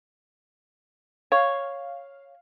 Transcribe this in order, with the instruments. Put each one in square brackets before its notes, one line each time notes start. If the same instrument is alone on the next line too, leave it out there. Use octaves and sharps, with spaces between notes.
[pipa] C#5 [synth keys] F5